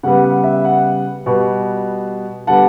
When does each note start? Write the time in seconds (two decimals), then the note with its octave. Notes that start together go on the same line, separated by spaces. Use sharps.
0.03 C#3 G3 B3 F#5
0.24 F#5
0.44 E5
0.64 F#5
1.26 B2 G3 B3
2.47 D3 G3 B3 F#5 A5